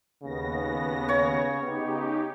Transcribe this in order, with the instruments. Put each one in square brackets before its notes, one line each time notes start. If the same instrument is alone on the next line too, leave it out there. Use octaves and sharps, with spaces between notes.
[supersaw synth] D#2 B3 A#6 [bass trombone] C#3
[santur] C#5
[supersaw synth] C#3 D#4 G4 [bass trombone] B3